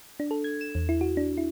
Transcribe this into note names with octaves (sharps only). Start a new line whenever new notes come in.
D4
A4
G#6
E7
E2
E4
F#4
D4
E4